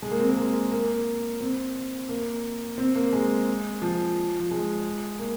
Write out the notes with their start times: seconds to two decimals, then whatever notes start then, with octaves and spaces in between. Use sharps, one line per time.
0.02 G#3
0.11 A#3
0.20 C4
0.29 A#3
0.36 G#3
0.71 A#3
1.40 C4
2.09 A#3
2.78 C4
2.96 A#3
3.13 G#3
3.82 F3
4.40 F3
4.51 G#3
5.19 A#3